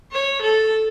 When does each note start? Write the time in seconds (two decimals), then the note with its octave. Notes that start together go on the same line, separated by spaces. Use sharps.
0.12 C#5
0.42 A4